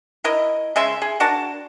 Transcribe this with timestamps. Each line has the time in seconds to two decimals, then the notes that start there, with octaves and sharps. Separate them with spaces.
0.24 E4 A#4 D#5
0.76 C#3 G#3 E5 C6
1.02 G#4
1.20 D4 F#4 A#4 A5